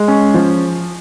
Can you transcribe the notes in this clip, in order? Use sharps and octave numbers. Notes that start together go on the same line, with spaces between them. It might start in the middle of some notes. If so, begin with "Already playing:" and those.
Already playing: G#3
C#4
F3